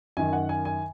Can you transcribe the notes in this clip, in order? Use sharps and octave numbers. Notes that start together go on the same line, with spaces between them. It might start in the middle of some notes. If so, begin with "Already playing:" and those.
F#2 D#3 G#5
F#5
G#5
G#5